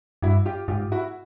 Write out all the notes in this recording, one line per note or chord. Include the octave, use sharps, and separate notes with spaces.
G2 E4 F#4
F4 G4
G#2 F4 G4
E4 F#4